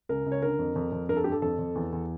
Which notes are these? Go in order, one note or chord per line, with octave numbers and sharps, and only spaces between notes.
C#2 A#4
C#2
C#5
D3 A#4
F2
F2
F2
G2 A#4
A4
G2 G4
A4
F2 A4
F2
E2
E2